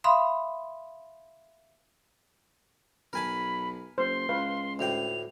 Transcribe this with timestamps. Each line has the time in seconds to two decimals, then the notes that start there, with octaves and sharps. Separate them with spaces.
0.04 E5 F5 B5 C6 D#6
3.13 B1 A#4 G#5 A5 B5
3.98 F#1 C5 C6
4.29 C#2 B4 F5
4.79 D2 A2 G5 F7